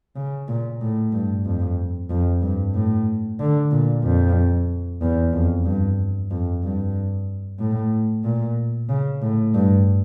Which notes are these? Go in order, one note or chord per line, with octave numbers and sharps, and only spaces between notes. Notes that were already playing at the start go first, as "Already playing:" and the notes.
C#3
A#2
A2
G2
F2
F2
G2
A2
D3
A#2
F2
E2
F2
G2
F2
G2
A2
A#2
C#3
A2
G2